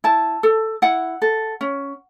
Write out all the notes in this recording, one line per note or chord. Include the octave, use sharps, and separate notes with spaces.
E4 A5
A4
E4 F#5
A4
C#4